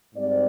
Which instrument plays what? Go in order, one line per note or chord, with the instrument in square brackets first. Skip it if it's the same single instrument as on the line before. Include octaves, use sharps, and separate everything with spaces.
[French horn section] G#2 G3 C4 D5